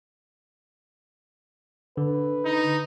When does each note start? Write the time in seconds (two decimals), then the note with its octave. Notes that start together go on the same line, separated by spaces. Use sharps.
1.97 D3 B4
2.45 D#4